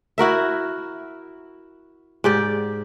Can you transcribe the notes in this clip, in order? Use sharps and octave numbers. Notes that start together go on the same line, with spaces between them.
E4 F#4 A#4 E5
G#2 G4 D5